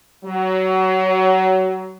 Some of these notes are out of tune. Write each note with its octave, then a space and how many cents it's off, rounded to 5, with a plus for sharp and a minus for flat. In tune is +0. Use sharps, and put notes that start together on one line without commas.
F#3 +25